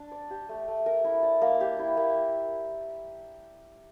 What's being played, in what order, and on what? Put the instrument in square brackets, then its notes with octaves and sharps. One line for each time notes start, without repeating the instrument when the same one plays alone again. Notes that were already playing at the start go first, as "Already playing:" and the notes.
Already playing: [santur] D4
D5
G4
A3
A3
A#4
E4
D5
A#3
G4
E4
A#3